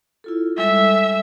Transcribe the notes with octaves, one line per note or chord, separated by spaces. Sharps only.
E4 F4 A4
G3 G#3 A4 E5